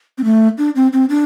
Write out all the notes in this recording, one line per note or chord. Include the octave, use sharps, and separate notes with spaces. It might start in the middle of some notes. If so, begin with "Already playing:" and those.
C4
A3
D4
C4
C4
D4